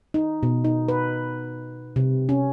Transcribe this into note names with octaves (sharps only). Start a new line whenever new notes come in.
D#4
B2
D#4
B4
C3
C#4